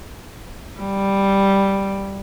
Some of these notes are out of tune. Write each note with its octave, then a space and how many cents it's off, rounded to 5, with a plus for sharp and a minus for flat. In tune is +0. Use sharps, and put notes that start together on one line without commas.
G3 +0